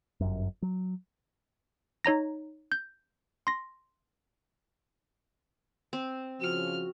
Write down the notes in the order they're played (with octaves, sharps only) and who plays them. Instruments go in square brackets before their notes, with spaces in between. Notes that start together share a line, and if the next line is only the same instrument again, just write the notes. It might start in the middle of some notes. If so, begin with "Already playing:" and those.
[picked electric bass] G1 F#2
F#3
[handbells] D#4 C#5 A#5 A#6
G6
C6 A#6
[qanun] C4
[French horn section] C#3 F3 [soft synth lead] F#4 [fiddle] F6